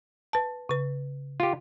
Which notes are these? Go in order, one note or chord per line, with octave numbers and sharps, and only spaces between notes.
B4 A5
C#3 B4
F4 G4